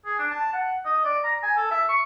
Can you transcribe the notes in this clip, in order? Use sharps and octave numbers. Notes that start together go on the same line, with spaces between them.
G#4
D4
A5
F#5
D#5
D5
A#5
G#5
A4
E5
C#6